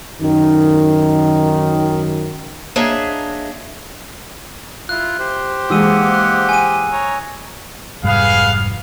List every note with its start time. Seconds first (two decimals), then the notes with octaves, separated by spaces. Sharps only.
0.22 F#2 D#3
2.76 A#3 D4 G#4 C#5 D#5 E5
4.89 E4 F4 F#6
5.19 G4 C5
5.70 G#2 E3 G#3 A#3 F#5 D#6 E6 D#7
6.14 F#6
6.49 G#5 D#7
6.92 C#5 A#5
8.03 F1 G#2 G3 B3 G#4 F5